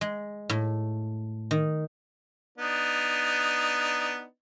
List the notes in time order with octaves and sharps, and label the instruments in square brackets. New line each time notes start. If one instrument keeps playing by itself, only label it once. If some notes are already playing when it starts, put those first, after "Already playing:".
[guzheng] G#3
A2
D#3
[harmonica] B3 D4 D#4